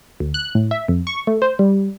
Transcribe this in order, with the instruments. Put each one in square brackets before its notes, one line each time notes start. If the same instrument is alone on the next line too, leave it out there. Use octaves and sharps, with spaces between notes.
[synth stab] D2
F#6
A2
E5
F2
C#6
A3
C5
G3